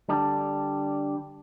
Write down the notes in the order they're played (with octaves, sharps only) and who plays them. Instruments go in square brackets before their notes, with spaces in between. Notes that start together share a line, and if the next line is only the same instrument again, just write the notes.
[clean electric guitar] D3 G3 D4